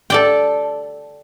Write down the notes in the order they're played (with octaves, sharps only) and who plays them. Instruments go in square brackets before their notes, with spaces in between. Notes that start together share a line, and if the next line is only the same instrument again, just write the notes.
[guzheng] A4 D5 G5